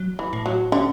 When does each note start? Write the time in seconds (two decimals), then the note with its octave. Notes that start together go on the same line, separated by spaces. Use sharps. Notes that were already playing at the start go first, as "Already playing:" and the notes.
Already playing: F#3
0.19 E3
0.33 A2
0.46 F#3
0.72 D3 C#4